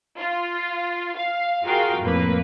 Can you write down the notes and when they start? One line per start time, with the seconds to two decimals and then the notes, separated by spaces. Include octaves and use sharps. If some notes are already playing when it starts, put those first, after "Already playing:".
0.18 F4
1.17 F5
1.64 F4 F#4 G#4 A#4 F5 G5
2.00 F2 A2 A#3 B4